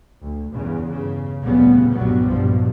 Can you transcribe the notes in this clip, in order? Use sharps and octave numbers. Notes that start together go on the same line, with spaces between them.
D2
E2 G2 C#3
C#3
F1 D2 A#2 C#3 G3 B3
C2 G2 A#2 F#3 G3 B3
A#1 G2 B2 F3